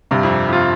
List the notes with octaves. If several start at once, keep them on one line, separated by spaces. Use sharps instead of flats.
G2 C3
F2
F2 F4